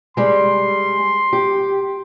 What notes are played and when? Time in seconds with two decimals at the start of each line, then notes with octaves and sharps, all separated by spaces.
0.17 G3 G#3 C6
1.33 G4